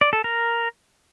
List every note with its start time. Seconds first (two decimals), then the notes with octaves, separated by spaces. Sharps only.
0.01 D5
0.13 A4
0.24 A#4